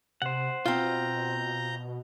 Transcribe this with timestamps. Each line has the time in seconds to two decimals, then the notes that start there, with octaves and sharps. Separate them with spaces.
0.22 C3 C5 F#5
0.66 B2 C4 F4 A#5 G6